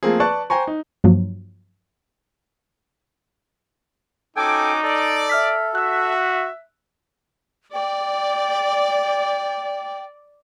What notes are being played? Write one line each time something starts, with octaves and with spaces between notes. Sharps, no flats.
F3 A3 A#3 C4 G#4
B4 D5 A5 C#6 F#6
C5 G5 G#5 A#5 C#6
D#4
G2 F3 F#3 A#3
C#4 D#4 F#4 A4 G5 G#5 D6
A4 D5
E5 F6 B6
F#4 E5 E6 F#6
D5 G5